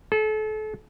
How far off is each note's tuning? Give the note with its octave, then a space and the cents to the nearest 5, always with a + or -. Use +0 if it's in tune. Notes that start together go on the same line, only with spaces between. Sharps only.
A4 -35